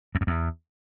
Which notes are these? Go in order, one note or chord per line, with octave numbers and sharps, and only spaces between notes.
E2
F#2
E2